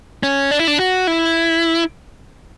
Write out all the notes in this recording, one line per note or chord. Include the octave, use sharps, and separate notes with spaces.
C#4
D4
E4
D4
F#4
E4